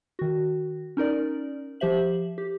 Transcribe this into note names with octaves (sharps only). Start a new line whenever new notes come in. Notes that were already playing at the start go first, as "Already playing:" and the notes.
D#3 F#4
C#4 D#4 A#4 D5
F3 G4 C5 E5 F#7
G4